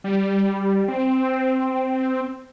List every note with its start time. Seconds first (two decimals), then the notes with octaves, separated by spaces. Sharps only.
0.04 G3
0.88 C4